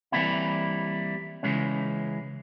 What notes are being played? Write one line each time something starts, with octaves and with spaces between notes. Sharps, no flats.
E3 F#3 G3 A#3 C4 E4
C#3 E3 G#3 C#4